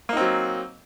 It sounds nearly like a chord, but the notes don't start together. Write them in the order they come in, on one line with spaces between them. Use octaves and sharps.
A#3 D#4 C4 F#3